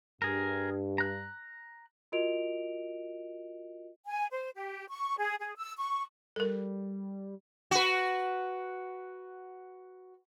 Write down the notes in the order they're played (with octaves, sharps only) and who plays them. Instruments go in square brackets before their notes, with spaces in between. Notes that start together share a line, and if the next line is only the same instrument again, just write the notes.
[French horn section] G2 [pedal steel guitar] G#4 A#4
[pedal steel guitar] A#5 F#6
[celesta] F4 F#4 A#4 D#5 D7 F7
[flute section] G#5
C5
G4
C#6
G#4
G#4
E6
C#6
[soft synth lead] G3 [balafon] A4 A#4
[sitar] F#4 B4